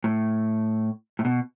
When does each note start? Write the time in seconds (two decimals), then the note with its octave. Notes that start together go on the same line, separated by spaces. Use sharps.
0.04 A2
1.19 A2
1.25 B2